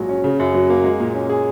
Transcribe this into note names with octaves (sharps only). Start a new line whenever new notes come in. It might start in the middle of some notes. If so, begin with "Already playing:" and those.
Already playing: A#1 G#2 F#3
C#4
C#3
F#2
F#3
A#3
G#3
A#2
C#4
G#4